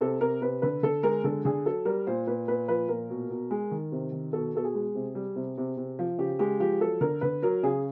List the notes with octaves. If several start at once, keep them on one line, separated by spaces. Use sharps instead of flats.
C3 A4
C3 A#4
C3 B4
D3 B4
D3 A4
G#3 A#4
D3 A4
D3 G#4
F#3 A4
G3 A#4
A#2 C5
A#2 B4
A#2 B4
F3 B4
A#2 A#4
B2
B2
G#3
D#3
C3
D#3
B2 A4
B2 A4
G#4
G#3
C3
G3
C3
C3
C3
F3
C#3 G4
G#3 G4
F3 G4
F#3 A4
D3 A#4
D3 B4
F#3 A#4
C#3 G#4